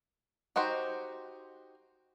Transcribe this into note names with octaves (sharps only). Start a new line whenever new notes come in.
D#4 F#4 G4 C5